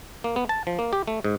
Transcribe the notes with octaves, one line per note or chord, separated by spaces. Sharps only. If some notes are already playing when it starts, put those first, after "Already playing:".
A#3
B3
A5
F3
A#3
G4
A3
G#2